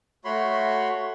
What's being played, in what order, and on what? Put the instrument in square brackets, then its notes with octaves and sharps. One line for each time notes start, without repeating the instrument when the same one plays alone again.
[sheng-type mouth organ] A3 F#4 C#5 B5 C6